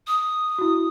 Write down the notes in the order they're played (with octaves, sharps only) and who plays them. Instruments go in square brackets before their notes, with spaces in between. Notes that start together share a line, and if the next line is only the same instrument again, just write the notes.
[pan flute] D#6
[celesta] E4 F#4